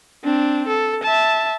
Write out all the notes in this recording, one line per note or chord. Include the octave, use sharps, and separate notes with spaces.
C4 D4
A4
E5 A5